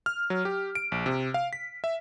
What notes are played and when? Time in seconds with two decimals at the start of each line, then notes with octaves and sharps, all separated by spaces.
0.06 F6
0.30 F#3
0.45 G4
0.75 D7
0.92 A#1
1.06 C3
1.34 F5
1.53 B6
1.84 E5